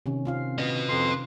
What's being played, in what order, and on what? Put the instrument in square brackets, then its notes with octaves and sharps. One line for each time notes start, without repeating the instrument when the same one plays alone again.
[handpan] C3 D#3 C#4
C4 F4 F5
[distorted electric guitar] B4 D#5
[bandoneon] F2 C6